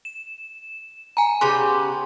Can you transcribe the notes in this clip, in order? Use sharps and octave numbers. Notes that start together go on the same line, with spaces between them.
E7
G#5 A#5
C#3 B3 G4 C6